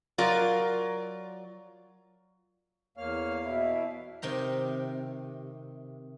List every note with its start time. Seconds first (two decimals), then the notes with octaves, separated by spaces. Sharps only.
0.18 F#3 F4 A#4 D5
2.97 E2 A#3 C#5 F5 F6
3.45 B2 E4 E5
4.22 C3 D#3 G5 A#5